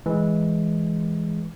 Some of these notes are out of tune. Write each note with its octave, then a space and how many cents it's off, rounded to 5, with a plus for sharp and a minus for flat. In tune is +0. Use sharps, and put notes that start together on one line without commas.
E3 +0 G#3 +0